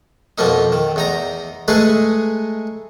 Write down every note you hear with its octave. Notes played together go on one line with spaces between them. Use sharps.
F2 B2 F3 A#3 D#4
D#3
E2 D#4 A#5
G#3 A3 D#4 G#4 B4